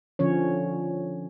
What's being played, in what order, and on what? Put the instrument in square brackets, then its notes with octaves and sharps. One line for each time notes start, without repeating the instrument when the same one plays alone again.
[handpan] D3 F3 C#4 C#5